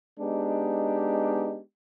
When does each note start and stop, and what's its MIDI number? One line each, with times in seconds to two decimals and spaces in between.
0.19 1.60 56
0.19 1.60 59
0.19 1.60 62
0.19 1.60 63
0.19 1.60 67